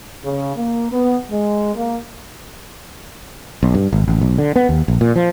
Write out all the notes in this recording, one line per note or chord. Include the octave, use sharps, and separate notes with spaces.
C#3
A#3
B3
G#3
A#3
B1
G2
G#1
A1
B1
D3
B3
D#2
A#1
A#2
F3